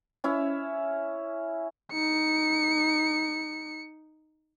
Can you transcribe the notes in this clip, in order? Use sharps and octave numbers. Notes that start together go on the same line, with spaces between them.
C#4 E4 E5
D#4 C#7